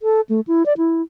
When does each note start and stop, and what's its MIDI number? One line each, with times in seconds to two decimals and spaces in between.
0.02 0.21 69
0.29 0.41 57
0.47 0.65 64
0.66 0.73 74
0.77 1.02 64